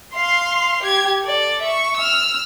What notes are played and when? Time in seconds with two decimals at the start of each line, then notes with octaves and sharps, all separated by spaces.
0.14 F5 C6
0.83 G4 G#6
1.22 A4 D5
1.62 E5 C#6
1.97 E6 F6